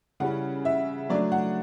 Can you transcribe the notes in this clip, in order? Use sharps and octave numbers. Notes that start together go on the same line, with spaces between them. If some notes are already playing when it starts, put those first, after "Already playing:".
C#3 G3 C#4 E4 F#5
E5
F#3 A3 D4 D5
F#5